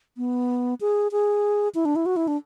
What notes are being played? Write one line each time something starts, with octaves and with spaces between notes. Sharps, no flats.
B3
G#4
G#4
E4
D4
E4
F#4
E4
D4